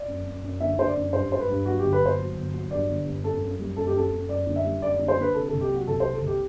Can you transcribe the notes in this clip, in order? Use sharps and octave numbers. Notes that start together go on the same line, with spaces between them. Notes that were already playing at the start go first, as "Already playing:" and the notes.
Already playing: D5
F#2
F#2
F#2
D3 E5
D3 C5
D5
F#2
G2 C5
G2 C5
B4
G2
F#3 F#4
G1 G4
B4
G1 C5
F#3
G1
F#3
G2 D5
G1
G2
F#2 A4
F#2
G3
F#2 A4
G4
F#2 A4
F#2
F#2 D5
D3
E5
G3
F#2 D5
D3 D5
C5
D3 B4
C3 A4
C2 A4
G4
F#3 F#4
C2 A4
C3 C5
A4
C2
G4